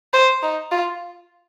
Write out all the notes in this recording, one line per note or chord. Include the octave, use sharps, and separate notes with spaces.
C5
D#4
F4